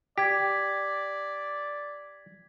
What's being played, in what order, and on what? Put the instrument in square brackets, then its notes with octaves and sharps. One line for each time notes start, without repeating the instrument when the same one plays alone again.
[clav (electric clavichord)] G4 [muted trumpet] D5 [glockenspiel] G#6 B6